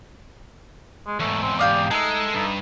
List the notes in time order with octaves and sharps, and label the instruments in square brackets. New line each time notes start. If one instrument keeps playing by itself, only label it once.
[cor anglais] G#3
[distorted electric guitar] E2 G#2 [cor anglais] A3
[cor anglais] C4
[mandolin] G4 F5 D#6 [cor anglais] D5
[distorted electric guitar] G#3 [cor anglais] D#4 [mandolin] A4 E5
[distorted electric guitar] G2 [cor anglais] D#4